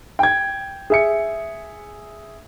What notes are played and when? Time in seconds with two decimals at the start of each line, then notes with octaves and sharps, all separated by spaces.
0.19 G5 G#6
0.90 G#4 E5 C#7